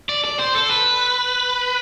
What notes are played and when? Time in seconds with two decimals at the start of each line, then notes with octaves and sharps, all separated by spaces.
0.09 D5
0.25 D5
0.39 C5
0.55 A4
0.69 B4